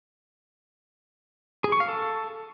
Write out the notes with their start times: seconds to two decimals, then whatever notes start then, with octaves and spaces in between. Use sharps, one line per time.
1.64 G#4
1.72 C#6
1.80 F5
1.88 A4